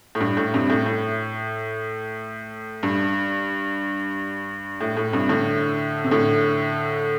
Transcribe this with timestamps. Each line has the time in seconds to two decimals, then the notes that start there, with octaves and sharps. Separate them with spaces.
0.15 A2
0.20 G2
0.37 A2
0.54 G2 C3
0.70 A2
0.86 A2
2.83 G2
4.81 A2
4.97 A2
5.12 G2 C3
5.29 A2 D3
6.04 C3
6.11 A2 D3